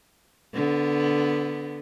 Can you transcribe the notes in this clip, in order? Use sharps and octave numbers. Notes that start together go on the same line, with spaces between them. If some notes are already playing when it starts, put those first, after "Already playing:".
D3 B3